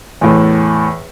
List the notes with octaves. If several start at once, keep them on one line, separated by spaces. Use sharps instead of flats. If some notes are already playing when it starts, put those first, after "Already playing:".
E2 A2